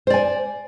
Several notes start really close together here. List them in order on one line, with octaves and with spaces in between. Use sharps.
C5 D5 G#5